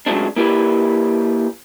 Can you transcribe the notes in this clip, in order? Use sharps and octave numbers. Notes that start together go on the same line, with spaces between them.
C#3 F#3 G#3 A3 C4 D4
A#3 E4 G4 B4 D5